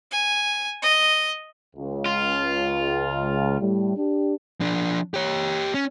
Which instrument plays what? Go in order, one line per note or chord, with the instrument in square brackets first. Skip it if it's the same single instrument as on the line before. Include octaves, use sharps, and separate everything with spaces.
[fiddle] G#5
D#5
[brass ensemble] C#2
[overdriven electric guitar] F4
[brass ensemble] A2 G3
D4 G4
[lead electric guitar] F3 D4
G4 C#5
C#4